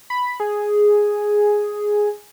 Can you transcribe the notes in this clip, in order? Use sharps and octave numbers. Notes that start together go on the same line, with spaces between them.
B5
G#4